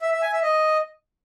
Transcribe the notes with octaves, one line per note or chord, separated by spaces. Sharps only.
E5
E5
G#5
E5
D#5